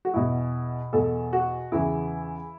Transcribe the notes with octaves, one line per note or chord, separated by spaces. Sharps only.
F#4
E2 B2 E4
E2 B2 A4
F#4
E2 C#3 E3 E4